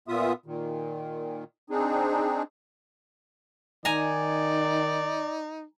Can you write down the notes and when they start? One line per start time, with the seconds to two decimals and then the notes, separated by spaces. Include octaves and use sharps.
0.08 A#2 B3 F4 E5 D#6
0.46 A#2 D#3
1.70 C4 D4 D#4 G#4
3.85 D#3 D#4 D5 G#5 A#5